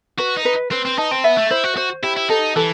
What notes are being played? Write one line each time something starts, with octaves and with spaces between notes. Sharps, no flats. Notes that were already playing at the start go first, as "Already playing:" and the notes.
F#4 B4
D#4
B4
C4 B4
C4
D#4 A5
C4
B3 E5
A3
E4 C5
F#4
F#4 C5
E4 G4
E4
D#4 A4
E3 A4